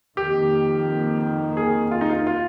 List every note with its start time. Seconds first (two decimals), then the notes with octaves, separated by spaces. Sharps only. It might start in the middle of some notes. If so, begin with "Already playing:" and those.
0.17 F2 D#3 A#3 G4
1.57 G#4
1.91 F4
2.01 D#4
2.10 F4
2.27 F4